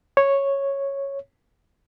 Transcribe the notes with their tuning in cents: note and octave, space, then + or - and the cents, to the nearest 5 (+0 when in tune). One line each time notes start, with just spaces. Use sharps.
C#5 -5